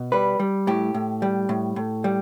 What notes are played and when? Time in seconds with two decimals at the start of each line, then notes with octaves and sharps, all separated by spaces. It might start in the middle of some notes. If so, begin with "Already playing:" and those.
Already playing: B2
0.12 G3 B4
0.39 G3
0.67 A2 G4
0.94 A2
1.22 G3
1.49 A2
1.76 A2
2.04 G3